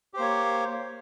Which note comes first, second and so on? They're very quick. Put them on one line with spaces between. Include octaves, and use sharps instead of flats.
G4 C5 A#3 C#5